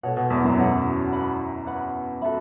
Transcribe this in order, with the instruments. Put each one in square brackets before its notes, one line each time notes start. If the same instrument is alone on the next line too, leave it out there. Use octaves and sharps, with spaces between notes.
[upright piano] B2 [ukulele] A4 C#5 F#5
[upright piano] B2
E2 E3
F#2 F#3
[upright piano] B2 [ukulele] A4 C#5 F#5
[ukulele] B4 F#5 B5
B4 F#5 B5
F#4 A4 E5 B5